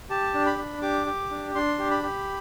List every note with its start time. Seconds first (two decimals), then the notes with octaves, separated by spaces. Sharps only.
0.10 G4 A5
0.34 D4
0.46 B5
0.58 D4
0.82 G4 D6
1.06 G4
1.31 D4
1.55 D4 C6
1.79 G4
1.91 B5
2.03 G4